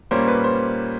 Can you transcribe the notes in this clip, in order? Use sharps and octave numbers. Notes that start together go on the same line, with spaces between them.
A#2 G3 A#3 C#4 C5
B4
C5